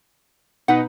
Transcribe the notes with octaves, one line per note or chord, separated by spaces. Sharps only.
B2 D#4 B4 F#5